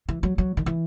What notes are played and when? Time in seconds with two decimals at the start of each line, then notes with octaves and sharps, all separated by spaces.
0.09 E3
0.23 F#3
0.38 F#3
0.57 D#3
0.66 E3